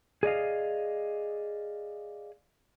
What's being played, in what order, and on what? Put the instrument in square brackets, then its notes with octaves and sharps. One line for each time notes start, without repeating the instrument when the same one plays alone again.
[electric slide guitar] G#4 D5 D#5 F5